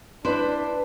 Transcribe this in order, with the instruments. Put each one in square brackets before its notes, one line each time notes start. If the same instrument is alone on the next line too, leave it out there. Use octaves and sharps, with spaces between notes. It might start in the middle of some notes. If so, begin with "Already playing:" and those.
[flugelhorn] D4 [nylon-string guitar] E4 B4 C5